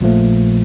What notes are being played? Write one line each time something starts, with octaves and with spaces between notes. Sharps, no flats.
A#1 A#2 F3 A3